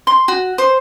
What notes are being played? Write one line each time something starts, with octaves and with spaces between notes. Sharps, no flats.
C6
F#4
C5